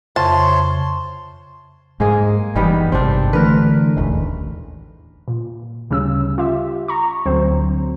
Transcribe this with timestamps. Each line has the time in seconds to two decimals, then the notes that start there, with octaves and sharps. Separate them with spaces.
0.16 F2 C#3 C5 C#5 E5 A5 C6
2.00 G#2 G#3 A#3 G#4
2.56 F#1 D#3 E3 G3 B3
2.92 G#1 G2 C3 C4 D4
3.33 D3 E3 A3 A#4 B4
3.96 E1 A1 D#2
5.28 A#2
5.90 D2 C#3 G3 C#4 E6
6.38 F4 G4 E5
6.88 A#5 C#6
7.26 D2 D3 F#3 C4 C5